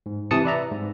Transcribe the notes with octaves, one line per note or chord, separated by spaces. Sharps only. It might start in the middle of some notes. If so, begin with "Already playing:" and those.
G#2
C3 E3 A5 D#6 C#7
B4 D5 E5 A#5
G#2